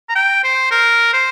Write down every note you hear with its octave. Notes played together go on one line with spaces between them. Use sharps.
A#5
G5
C5
A#4
C5